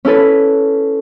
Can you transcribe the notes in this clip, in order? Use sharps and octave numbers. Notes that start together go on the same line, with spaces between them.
C#4 E4 A4 B4